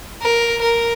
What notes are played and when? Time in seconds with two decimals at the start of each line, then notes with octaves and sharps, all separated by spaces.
0.22 A#4
0.61 A#4